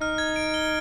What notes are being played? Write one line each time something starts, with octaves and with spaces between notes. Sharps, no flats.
D#4 F6
G#6
D7
G7